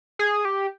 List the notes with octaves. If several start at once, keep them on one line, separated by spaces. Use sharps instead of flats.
G#4
G4